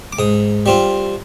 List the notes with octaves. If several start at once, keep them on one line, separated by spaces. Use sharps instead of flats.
D6
G#2 D#6
G3 C4 F4